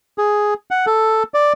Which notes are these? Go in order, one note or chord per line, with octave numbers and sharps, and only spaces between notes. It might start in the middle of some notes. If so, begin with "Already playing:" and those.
G#4
F#5
A4
D5